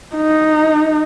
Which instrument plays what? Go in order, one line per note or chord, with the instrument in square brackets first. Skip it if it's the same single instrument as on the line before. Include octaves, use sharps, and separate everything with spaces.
[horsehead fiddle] D#4